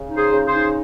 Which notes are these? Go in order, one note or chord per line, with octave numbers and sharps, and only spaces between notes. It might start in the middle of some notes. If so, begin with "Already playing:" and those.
Already playing: C#3
D#4
G#4 C5
C#3
G#4 C5
D#4